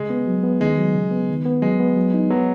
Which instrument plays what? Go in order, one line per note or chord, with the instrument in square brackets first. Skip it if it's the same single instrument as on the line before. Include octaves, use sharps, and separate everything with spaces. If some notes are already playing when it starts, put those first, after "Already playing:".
Already playing: [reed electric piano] C#3 [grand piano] G#3
[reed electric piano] B3
F#3
B3
[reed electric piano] D#3 [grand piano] G#3
[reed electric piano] F#3
C#3
B3
D#3
B3
[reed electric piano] F#3 [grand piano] G#3
[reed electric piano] B3
F#3
D#4
[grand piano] F#3 [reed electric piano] B3